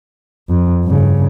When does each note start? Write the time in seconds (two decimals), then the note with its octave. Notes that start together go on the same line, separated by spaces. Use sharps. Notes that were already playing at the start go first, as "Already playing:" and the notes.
0.49 F2
0.85 G2 C#3